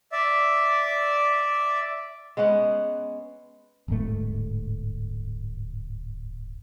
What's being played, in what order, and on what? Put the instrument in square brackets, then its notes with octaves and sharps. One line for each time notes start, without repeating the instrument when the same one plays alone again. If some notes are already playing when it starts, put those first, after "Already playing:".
[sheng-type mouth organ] D5 E5
[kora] G#3 B3 C#4 F#5
[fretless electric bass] D1 G1 G#2 A3